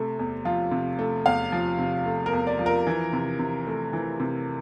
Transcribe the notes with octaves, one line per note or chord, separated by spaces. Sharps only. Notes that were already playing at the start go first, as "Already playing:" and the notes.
Already playing: C3 A3
E2
F3 F4
C3
A3
E2 F5
F3
C3
A3
A#4
E2
D5
F3
A#4
E3
C3
C3
A3
E3
C3